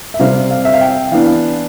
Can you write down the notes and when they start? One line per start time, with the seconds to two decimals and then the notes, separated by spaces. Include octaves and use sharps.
0.14 E5
0.19 C3 G3 C4 F5
0.51 F5
0.65 E5
0.74 F5
0.81 G5
1.11 E3 B3 D4 F5